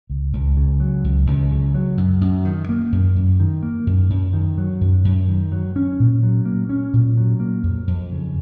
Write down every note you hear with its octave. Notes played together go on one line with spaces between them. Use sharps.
C#2
C#2
C#3
F#3
C#2
C#2
C#3
F#3
F#2
F#2
D#3
A#3
F#2
F#2
D#3
A#3
F#2
F#2
D#3
F#3
F#2
F#2
D#3
F#3
C#4
A#2
F#3
A#3
C#4
A#2
F#3
A#3
F2
F2
C#3